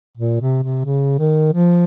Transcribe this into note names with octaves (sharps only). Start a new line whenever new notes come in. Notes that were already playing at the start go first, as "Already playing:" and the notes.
A#2
C3
C3
C#3
D#3
F3